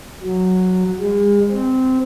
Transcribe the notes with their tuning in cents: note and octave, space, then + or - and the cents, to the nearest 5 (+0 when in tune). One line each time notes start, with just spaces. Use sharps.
F#3 -5
G#3 -40
C4 -15